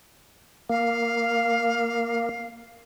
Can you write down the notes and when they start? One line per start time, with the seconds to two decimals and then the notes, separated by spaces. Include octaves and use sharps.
0.70 A#3 F5